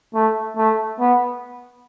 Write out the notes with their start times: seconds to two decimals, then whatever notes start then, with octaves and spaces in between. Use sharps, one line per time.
0.14 A3
0.57 A3
1.00 B3